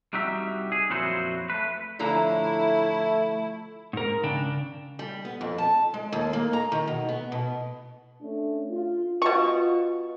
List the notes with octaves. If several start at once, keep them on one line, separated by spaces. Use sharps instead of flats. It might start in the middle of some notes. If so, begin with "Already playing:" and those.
C2 G3 D#4 F#4 G4 E5
G#4
F2 A#2 F#3 E4 F#4 C5
A3 B4
A2 D3 F3 A3 E4 A#5
G#2 A#4
C#3 D4 G5
G3
B3
F2
A5
G#3
D#2
A#3
A#5
D#3
B2
B3
B2
A3 C#4 D4
F4
B2 F4 C#6